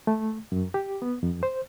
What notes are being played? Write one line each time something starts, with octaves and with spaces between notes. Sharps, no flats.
A3
F#2
G4
B3
F2
C5